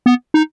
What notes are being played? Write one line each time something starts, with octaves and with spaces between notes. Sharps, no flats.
B3
D#4